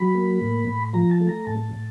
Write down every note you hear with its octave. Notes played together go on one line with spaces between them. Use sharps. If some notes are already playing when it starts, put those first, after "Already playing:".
Already playing: F#3 B5
A#3
A2
A2
F3 A#5
A5
A3
A#5
A2 A5
A2